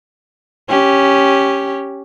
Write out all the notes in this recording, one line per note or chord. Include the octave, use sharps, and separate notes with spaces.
C#4 G4